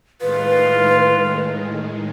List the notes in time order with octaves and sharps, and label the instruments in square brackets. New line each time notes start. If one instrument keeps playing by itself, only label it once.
[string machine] A2 D#3 G#3 [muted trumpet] F4 [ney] B4